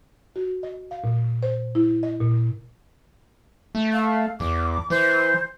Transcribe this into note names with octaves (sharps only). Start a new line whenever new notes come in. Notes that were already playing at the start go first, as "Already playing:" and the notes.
F#4
D#5
F5
A#2
C5
E4
D#5
A#2
A3
F5
E2 D6
E3 C5